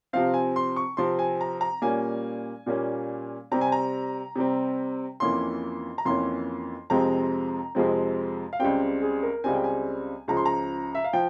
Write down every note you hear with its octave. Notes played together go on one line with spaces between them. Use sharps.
C3 F3 C4 F5
G#5
C6
C#6
C3 F3 C4 C6
G#5
A#5
A#5
A#2 G3 A#3 C#4 G#5
A#2 G3 A#3 C#4
C3 G3 C4 A#5
G#5
A#5
C3 G3 C4
F2 E3 A#3 C#4 C6
A#5
F2 E3 A#3 C#4 C6
F2 C3 F3 G#3 C4 A#5
F2 C3 F3 G#3 C4
F5
C#2 C#3 G3 C4 G5
G#4
A#4
C#2 C#3 G3 C4 G#5
G5
G#5
C#2 C#3 F3 A#5
C6
A#5
E5
F5
F3 G5